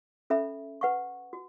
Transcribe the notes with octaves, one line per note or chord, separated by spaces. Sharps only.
C#4 A4 E5 B5
B4 F#5 C#6
F#4